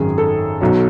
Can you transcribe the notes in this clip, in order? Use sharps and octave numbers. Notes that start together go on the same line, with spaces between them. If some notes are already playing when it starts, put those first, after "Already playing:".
Already playing: G#1 F#2 D#3 G#4
A4
B1 B2 F#3